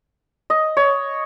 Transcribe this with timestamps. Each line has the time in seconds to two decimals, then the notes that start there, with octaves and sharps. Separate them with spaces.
0.50 D#5
0.77 C#5